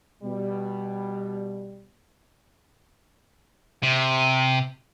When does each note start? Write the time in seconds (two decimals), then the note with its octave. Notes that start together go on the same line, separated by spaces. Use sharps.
0.23 B2 G3
3.83 C3